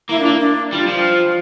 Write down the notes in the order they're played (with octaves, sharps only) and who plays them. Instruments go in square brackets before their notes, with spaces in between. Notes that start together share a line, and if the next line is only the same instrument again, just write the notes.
[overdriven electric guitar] A#3 [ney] E4
[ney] D4
[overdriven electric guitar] A#3
[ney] D4
[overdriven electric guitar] G3 [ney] F4
[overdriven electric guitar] F3